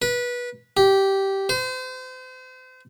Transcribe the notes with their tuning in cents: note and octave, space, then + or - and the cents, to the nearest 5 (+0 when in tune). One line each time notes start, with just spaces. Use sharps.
B4 -20
G4 -10
C5 -35